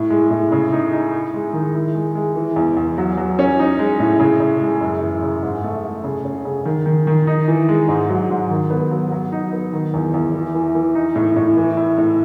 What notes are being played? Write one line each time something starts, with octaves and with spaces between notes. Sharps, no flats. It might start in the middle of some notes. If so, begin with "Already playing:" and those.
Already playing: A2
G#3
A2
C#3
D#4
D#4
E4
G#3
D#3
E4
G#3
G#3
E3
E2
E2
F#3
F#3
C#4
D#4
G#3
A2
C#3
C#3
G#3
F#2
E3
C#3
G#2
A3
A3
C#3
C#4
C#3
D#3
D#3
D#3
D#4
E3
G#3
G#2
F#3
G#2
D#3
B3
F#3
F#3
D#4
B3
D#3
E2
E2
E3
E3
E3
D#4
A2
A2
E3
E4
A2